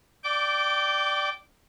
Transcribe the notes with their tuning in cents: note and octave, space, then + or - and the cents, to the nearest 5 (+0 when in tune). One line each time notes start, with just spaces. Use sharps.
D5 +5 G5 -15 D6 -20